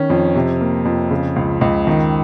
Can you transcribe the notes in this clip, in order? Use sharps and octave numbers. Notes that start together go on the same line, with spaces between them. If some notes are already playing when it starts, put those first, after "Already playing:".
Already playing: D#3 C#4
F2
C3
A#3
F2
C#3
C#2
C#2
D#3